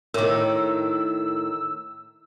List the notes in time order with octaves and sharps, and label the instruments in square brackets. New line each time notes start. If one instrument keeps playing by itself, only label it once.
[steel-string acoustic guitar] A2 D#3 [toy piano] A#4 D6 [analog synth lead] E6